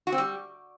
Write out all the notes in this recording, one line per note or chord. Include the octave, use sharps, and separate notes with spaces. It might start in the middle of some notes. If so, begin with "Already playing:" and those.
F#4
C4
G3